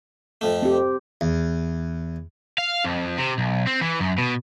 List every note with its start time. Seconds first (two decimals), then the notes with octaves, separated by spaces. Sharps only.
0.41 F2 A3
0.62 C4 G4
1.21 E2
2.58 F5
2.85 F2
3.18 C3
3.38 B1
3.67 C4
3.81 E3
4.00 F#2
4.18 B2